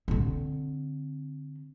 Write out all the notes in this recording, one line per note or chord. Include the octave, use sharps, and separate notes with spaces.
D3 C4